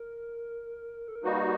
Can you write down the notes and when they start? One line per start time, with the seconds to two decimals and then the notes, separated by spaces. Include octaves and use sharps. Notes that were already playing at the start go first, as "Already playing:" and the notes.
Already playing: A#4
1.08 A4
1.15 A#4
1.24 G3 A#3 D#4 F#4 B4